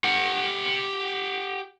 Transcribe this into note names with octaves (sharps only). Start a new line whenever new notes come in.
G4 F#5